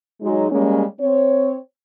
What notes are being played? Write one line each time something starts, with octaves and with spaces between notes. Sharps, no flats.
F#3 G#3 D#4
G3 G#3 A#3 C#4
C4 C#5